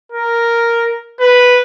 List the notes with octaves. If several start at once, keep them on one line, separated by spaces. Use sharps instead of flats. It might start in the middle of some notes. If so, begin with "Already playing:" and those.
A#4
B4